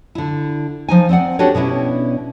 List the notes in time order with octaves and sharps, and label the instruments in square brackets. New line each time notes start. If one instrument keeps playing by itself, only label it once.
[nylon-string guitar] D3 E4
F3 D#4 G#5
C4 C5 D5 F#5
D4 F#4 G4 A4 B4 C#5
B2 C#4 D4 E4